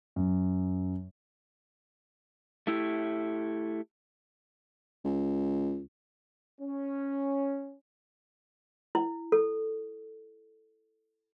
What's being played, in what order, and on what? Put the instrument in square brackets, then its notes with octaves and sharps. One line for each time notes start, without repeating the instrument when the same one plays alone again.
[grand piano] F#2
[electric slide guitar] A3 E4 G4
[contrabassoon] C#2
[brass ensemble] C#4
[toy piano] E4
A4